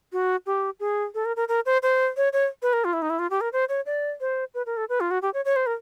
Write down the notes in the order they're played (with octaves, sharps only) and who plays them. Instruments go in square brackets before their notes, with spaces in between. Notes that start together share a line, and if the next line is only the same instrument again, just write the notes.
[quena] F#4
G4
G#4
A4
A#4
A#4
A#4
C5
C5
C#5
C#5
B4
A#4
F4
E4
D#4
E4
F4
G4
A#4
C5
C#5
D5
C5
B4
A#4
A4
B4
F4
F#4
G4
C#5
C#5
C5
A#4